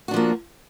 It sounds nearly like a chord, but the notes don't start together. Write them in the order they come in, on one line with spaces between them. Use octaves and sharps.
F#4 D4 F3 A#3